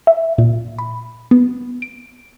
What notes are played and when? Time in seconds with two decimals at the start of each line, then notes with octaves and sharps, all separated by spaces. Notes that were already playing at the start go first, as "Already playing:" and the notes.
0.07 E5
0.38 A#2
0.78 B5
1.31 B3
1.82 D7